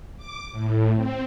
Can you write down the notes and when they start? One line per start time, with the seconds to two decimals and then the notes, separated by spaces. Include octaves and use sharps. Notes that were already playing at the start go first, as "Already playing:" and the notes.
0.17 D6
0.51 A2
0.95 C4